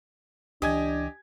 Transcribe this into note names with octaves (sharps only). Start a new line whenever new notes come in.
C#2 E3 D4 G4 D#5 G#5 G#6